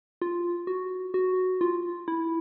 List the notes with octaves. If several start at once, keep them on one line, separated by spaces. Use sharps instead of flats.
F4
F#4
F#4
F4
E4